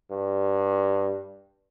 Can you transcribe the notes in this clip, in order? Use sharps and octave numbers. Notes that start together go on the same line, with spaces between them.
G2